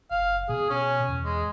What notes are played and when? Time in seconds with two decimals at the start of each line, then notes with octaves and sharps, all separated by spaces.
0.11 F#1 F5
0.49 B2 G#4
0.70 C#4
1.08 E2
1.25 G#3